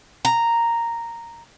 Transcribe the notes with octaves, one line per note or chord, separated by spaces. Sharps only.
A#5